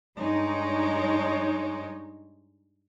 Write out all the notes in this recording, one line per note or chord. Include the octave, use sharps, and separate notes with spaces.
G2 G#3 D#4 C#5